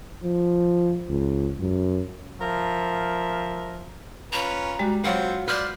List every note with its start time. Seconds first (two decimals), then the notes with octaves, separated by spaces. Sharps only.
0.23 F3
1.09 C#2
1.60 F#2
2.40 F3 A#4 E5
4.33 C#4 F4 B4 A#5
4.79 G3 G#3 F#4
5.04 F#3 C4 F4 B4 F#5
5.48 B4 C5 D5 F6